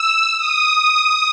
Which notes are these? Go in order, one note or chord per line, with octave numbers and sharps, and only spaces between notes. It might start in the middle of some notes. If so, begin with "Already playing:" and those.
Already playing: E6
D#6